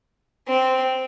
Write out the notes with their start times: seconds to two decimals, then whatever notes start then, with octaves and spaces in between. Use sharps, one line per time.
0.47 C4